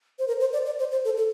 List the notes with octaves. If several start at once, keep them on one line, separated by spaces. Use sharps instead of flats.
C5
A#4
C5
D5
D5
C5
C5
A4
A4